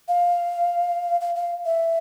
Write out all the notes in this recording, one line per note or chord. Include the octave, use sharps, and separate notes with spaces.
F5
F5
F5
E5